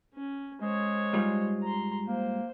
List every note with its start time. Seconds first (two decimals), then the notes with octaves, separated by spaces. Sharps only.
0.14 C#4
0.62 G#3 C5 C#5
1.13 G#2 G3 F4
1.63 A#5 C6
2.08 A#3 C5